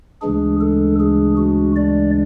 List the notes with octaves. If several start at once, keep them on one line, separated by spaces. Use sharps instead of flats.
D2 C#3 E3 G#3 D4 G#4
A4
G#4
F#4
D5